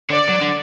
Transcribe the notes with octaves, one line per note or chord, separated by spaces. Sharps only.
D3 D5
F#3
D3